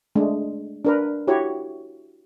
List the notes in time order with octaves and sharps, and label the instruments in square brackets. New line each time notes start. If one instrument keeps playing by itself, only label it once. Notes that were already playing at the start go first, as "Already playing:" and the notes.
[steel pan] G#3 A3 D4
D4 A#4 B4
E4 F#4 G4 C#5